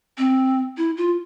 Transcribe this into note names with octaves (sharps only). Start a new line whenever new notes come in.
C4
E4
F4